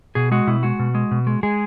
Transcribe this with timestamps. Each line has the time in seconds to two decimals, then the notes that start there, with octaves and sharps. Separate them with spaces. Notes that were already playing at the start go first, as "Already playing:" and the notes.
0.15 B2 G#4
0.31 G#3 F#4
0.47 B2 E4
0.63 G#3 F#4
0.79 B2
0.95 G#3
1.11 B2
1.27 G#3
1.43 G#3 G#4